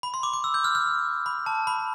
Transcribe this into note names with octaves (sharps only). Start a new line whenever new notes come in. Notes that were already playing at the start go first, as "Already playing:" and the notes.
B5
C6
D6
D6
E6
G6
F6
F6
B5
A5
B5